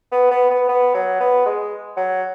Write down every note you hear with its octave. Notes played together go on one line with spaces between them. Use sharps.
B3
B3
B3
B3
F#3
B3
G#3
F#3